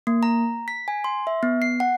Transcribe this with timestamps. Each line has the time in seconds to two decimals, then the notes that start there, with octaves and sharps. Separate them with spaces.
0.07 A#3
0.23 A#5
0.68 B6
0.88 G#5
1.04 C6
1.27 E5
1.43 B3
1.62 C7
1.80 F#5